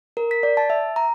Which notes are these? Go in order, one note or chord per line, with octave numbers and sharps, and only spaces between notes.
A#4
B6
D5
A5
E5
A#5